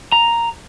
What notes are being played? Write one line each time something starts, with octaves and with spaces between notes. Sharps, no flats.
A#5